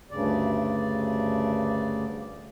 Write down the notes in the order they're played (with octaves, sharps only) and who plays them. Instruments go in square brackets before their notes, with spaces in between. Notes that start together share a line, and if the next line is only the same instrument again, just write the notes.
[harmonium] D2 G2 C#3 D5